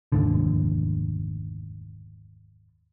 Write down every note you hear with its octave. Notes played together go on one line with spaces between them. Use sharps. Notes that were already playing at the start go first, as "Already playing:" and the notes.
F1 D#2 G#2 D3